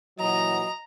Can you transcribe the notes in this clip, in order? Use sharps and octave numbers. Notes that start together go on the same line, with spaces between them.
A#2 E3 F#3 D#5 A#5